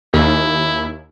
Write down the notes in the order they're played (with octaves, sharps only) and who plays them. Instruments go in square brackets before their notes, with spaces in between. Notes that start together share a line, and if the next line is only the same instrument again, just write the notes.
[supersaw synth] D#2 [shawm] E4